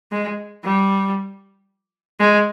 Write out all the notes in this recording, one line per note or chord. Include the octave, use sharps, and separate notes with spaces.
G#3
G3
G#3